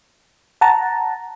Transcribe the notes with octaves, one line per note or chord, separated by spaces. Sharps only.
F#5 A5 A#5